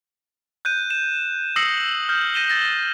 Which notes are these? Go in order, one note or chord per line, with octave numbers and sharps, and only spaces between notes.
F#6 G6 D#7
E7
D#6 E6 A#6 C7 C#7 F#7
F6 G6
A#6 D#7 E7 G7
A6 A#6